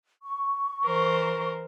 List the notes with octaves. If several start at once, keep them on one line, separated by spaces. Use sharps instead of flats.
C#6
E3 A#4 C5